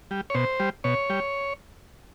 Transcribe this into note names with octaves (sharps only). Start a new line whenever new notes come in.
G3
C#5
B2 C5
G3
B2 C#5
G3